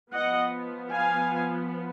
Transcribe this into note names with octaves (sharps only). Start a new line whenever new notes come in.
F3 B3 D#5 F#5
F5 G#5